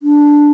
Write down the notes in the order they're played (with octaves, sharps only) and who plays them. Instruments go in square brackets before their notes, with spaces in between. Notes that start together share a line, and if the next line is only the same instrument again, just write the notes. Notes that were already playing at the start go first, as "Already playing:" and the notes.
[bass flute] D4